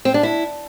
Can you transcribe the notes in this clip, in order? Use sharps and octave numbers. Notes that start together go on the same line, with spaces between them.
C4
D4
E4